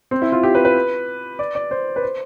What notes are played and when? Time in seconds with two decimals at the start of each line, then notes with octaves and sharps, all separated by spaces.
0.11 C4
0.22 E4
0.32 F4
0.43 G4
0.55 B4
0.65 B4
1.39 D5
1.55 D5
1.71 C5
1.96 B4
2.02 C5